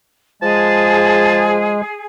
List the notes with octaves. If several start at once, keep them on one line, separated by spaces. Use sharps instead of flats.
F3 G#3 G#4 A5